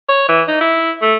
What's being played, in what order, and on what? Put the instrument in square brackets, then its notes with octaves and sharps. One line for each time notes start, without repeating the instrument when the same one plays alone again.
[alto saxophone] C#5
E3
D#4
E4
A3